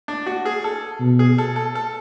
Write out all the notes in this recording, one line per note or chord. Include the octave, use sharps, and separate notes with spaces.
D4
F#4
G#4
A4
B2
G#4
A4
A4
A4